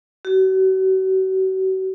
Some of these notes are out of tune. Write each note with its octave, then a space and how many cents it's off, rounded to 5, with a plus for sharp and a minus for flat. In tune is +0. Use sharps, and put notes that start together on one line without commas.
F#4 +40